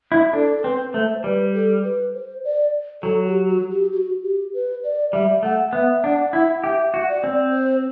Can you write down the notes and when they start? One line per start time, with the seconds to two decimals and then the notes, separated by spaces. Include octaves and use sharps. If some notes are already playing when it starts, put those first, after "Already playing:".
0.12 E4
0.33 D4 A4
0.58 A4
0.64 C4 B4
0.93 A3 C5
1.24 G3 B4
1.54 A4
1.83 B4
2.14 C5
2.44 D5
3.03 F#3 A4
3.27 G4
3.49 F#4
3.70 G4
3.93 F#4
4.23 G4
4.54 B4
4.84 D5
5.13 G3 E5
5.43 A3 F#5
5.73 B3 E5
6.04 D4 F#5
6.33 E4 F#5
6.64 G4 E5
6.94 F#4
7.09 D5
7.24 C4
7.52 C5